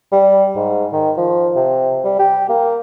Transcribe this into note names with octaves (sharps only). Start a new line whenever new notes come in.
G3
G#2
D#3
F3
C3
G3
G4
A#3